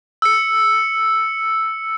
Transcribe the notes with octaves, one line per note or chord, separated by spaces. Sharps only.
E6 C#7